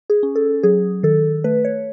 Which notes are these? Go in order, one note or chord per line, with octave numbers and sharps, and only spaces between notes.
G#4
C#4
A4
F#3 G#4
D#3 A4
A3 B4
C#5